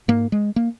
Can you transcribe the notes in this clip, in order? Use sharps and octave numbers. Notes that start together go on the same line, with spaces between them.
G#2 A#3
G#3
A#3